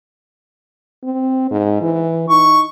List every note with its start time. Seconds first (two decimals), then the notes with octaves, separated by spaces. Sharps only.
1.04 C4
1.51 G#2
1.82 E3
2.30 D#4 C#6